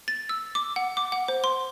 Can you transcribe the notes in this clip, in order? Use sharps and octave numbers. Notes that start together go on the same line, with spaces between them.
A6
E6
D6
F#5
D6
F#5
C5
C6